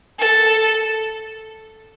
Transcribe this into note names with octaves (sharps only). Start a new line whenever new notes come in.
A4